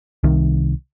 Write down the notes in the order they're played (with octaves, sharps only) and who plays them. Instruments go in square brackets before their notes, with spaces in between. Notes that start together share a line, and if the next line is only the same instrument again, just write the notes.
[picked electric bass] C2 C3 D#3